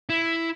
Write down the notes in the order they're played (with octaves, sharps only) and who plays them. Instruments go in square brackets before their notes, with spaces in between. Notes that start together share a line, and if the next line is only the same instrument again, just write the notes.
[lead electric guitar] E4